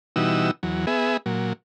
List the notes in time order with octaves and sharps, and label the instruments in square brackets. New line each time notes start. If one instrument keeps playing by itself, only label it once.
[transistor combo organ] B2 E3 G3 D#4 F#4 E6
E2 F#3
B3 G#4 E5
A#2 F#3